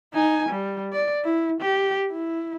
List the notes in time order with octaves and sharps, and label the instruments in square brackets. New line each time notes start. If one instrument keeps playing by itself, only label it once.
[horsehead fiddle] D#4 G#5
G3
D5
E4
G4
E4